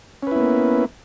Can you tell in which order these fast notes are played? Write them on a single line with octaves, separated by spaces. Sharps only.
C#4 B4 E4 B3 A#3